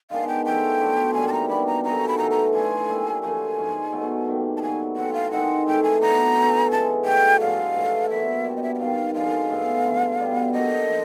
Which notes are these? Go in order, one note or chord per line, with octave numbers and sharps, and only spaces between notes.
D#3 G#3 B3 D4 F5
G5
F3 A3 C#4 E4 G5
F#3 B3 D4 F4
G#2 E3 G3 A#3 G#5
A5
A#5
G3 B3 D4 F#4 B5
A#5
D#3 F#3 A3 C#4 A#5
B5
A2 E3 A3 A#5
A#5
E3 A3 D4 F4 G#5
G3 A#3 C#4 E4
F#2 D3 F3 A3 G#5
G#2 F3 G#3 C#4
B2 F#3 A3
D#3 G3 A#3
A5
A2 F#3 B3 G#5
E3 A3 C4 F#5
F5
D#3 G#3 C4 D#4 F#5
A2 E3 A3 G5
G#5
F#3 B3 D4 A#5
E3 A3 C#4
C#3 E3 G#3 A5
A2 F#3 A3 G5
G2 D3 F3 G#3 F5
A2 E3 A3
A#2 F#3 B3 E5
G3 B3 D4 F#4
D#5
E5
E5
C3 D#3 G3 F5
F#2 D3 F3 G#3 F5
A2 E3 G#3 B3
G2 D3 F3
B2 G3 B3
D3 F#3 A#3 D4 D#5
F3